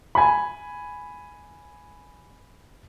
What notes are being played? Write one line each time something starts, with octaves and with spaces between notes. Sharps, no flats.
G#5 B5